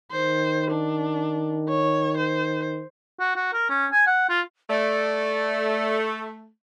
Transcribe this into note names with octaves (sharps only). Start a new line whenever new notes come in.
D#3 C5
D4
C#5
C5
F#4
F#4
A#4
C#4
G#5
F#5
F4
A3 D5